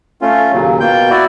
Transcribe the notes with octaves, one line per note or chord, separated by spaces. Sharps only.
A3 C#4 F4
D#2 A#2 C#3 F#3
B2 A#3 F4 G5 G6
E4 F#4 D5